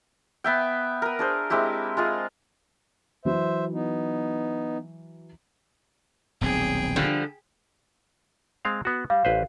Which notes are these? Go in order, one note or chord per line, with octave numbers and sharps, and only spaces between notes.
B3 E5 G5
A#4 B4
D4 G#4 C5
G#3 C4 E4 G4
G#3 F4 G#4
E3 F#3 C5 E5
B3 D#4
D#1 B1 C4 G#4 G5
D3 F3 G3
G#3 C4 F5
B3 F#4
G3 F5
A1 B4 C5